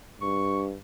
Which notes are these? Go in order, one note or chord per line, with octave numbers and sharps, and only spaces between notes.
G2 C#6